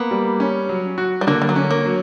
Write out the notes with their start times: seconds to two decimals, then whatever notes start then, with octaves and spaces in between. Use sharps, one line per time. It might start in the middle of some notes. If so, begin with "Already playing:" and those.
Already playing: A#3 B3
0.11 G3
0.40 C#4
0.69 F#3
0.98 F#4
1.21 G3
1.27 D3 A#3
1.42 G3
1.49 F#3
1.56 C#4
1.71 A#3
1.86 F#3